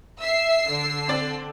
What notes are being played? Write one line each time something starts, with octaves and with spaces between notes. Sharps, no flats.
E5 E6 C7
D3
C4 D5 A6